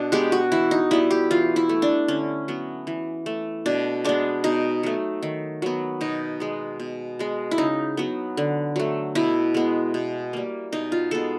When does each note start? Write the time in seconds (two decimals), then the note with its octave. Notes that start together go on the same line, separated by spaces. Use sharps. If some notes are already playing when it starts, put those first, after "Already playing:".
Already playing: B2 D4
0.12 G#3 B3 G4
0.32 F#4
0.52 E3 E4
0.71 D#4
0.91 G3 B3 E4
1.11 G4
1.31 E3 F4
1.56 E4
1.69 A3
1.82 D4
2.08 D3 C#4
2.48 F#3 B3
2.87 E3
3.26 A3
3.66 B2 D4
4.04 G#3 B3 D4
4.44 B2 D#4
4.83 F#3 A3
5.23 D#3
5.62 F#3 B3
6.01 B2 D#4
6.40 G#3 B3
6.80 B2
7.19 G#3 B3
7.51 E4
7.58 C#3 D#4
7.97 F#3 B3
8.37 D3
8.76 F#3 A3
9.15 B2 E4
9.54 G#3 B3
9.94 B2
10.33 G3 A#3
10.73 B2 D#4
10.92 F4
11.11 G#3 B3 A4